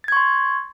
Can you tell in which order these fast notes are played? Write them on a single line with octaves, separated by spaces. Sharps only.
A6 G#6 C#6 C6